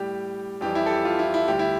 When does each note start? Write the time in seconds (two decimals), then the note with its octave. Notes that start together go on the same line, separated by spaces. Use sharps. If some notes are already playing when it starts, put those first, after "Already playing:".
Already playing: A2 G3 G4
0.61 F2 E3 G3 G4
0.75 E4
0.86 A4
0.90 G4
1.05 F4
1.19 E4
1.34 E4
1.48 D2 D3 G3 G4
1.59 E4